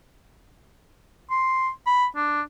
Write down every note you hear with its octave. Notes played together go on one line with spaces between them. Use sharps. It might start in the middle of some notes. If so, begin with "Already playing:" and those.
C6
B5
D4